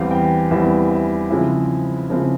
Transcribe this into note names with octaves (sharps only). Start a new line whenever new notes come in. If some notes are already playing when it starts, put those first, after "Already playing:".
Already playing: E2 E3 G3 C4 F5
G5
E2 E3 G3 C4 E5
E5
C#3 F3 G#3 C4 E4
C#3 F3 G#3 C4 E4